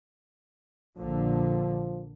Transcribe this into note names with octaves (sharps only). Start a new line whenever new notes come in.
A#1 A#2 D3 F3